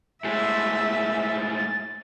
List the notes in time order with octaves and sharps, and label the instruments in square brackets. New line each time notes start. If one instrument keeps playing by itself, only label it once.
[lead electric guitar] A2 G#3 [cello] E5 [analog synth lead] A6